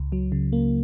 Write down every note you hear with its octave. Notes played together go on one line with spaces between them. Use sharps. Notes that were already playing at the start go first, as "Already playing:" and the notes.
Already playing: C#2
F#3
C#3
A#3